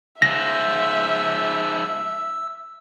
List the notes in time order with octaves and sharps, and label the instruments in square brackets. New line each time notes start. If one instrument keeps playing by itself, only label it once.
[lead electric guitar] G#2 F3 [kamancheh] E5 [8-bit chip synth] E6 [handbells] A#6